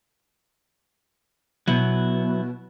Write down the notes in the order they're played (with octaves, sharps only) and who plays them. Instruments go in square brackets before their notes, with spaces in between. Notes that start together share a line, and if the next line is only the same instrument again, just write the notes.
[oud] B2 [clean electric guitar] F#3 E4